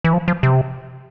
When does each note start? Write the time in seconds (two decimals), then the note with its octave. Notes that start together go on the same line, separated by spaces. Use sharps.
0.04 E3
0.13 F3
0.28 F3
0.43 C3